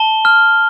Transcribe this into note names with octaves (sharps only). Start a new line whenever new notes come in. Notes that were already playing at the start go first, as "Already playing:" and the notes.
Already playing: A5 G7
F6